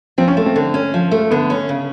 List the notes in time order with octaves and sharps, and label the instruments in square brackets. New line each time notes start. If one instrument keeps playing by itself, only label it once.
[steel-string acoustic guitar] F3 [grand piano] C4
[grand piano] C#4
[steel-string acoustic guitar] A3
[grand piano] C4
[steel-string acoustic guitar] D3
C#4
F3
A3
[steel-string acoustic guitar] D3 [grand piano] B3
[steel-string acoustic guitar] C#4
C#3